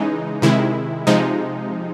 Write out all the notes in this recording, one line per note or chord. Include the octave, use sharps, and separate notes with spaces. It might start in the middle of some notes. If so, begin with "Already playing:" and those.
Already playing: C#3 E3 G#3 D#4
C3 D#3 G#3 E4
C3 F3 G#3 D#4